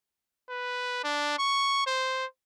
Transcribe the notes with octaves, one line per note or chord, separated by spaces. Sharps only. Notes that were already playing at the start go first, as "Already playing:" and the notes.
B4
D4
C#6
C5